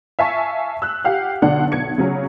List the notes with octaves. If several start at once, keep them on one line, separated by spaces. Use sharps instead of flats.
E5 F5 G#5 A5 C#6
E6 F#6
G4 F5 F#5
B1 D3 D4 F#5
B1 G#6 C#7
C#3 F#3 C#4